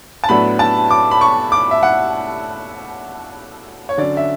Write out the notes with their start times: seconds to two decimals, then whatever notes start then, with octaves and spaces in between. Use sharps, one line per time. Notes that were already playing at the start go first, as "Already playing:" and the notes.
0.24 A5
0.29 A2 F#3 B3 D4 B5
0.59 A5
0.91 D6
1.11 B5
1.21 C#6
1.52 D6
1.71 E5
1.83 F#5
3.89 C#5
3.98 D3 F#3 C#4 D5
4.17 E5